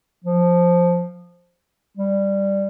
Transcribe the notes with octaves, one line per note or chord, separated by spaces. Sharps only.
F3
G3